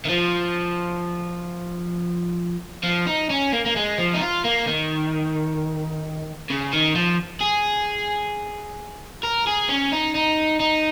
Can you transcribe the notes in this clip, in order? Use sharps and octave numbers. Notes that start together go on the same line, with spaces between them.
D#3
F3
F3
D#4
C#4
A#3
A#3
G#3
F3
D#4
F4
A#3
D#3
C#3
D#3
F3
G#4
A#4
G#4
C#4
D#4
D#4
D#4